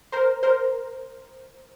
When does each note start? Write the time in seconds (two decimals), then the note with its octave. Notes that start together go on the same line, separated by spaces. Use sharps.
0.12 A#4 C5
0.43 A#4 C5